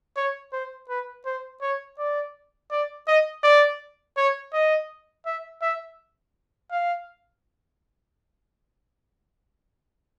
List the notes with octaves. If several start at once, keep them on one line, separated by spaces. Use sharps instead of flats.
C#5
C5
B4
C5
C#5
D5
D5
D#5
D5
C#5
D#5
E5
E5
F5